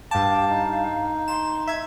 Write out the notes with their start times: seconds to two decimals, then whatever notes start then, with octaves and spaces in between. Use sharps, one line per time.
0.11 G2 F5 G5 A5 D6
0.50 D#4
1.28 C6 E7
1.67 E5 G#6